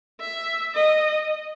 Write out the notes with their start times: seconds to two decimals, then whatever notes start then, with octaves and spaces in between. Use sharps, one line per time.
0.20 E5
0.74 D#5